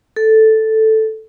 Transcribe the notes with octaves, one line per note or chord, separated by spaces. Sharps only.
A4